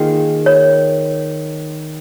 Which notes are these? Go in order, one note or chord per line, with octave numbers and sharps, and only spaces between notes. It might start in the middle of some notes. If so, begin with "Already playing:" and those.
Already playing: D#3 A#3 F4 G#4
C#5